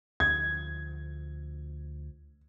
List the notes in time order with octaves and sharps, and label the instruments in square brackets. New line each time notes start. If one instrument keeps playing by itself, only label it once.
[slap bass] D2 F3 [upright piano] G#6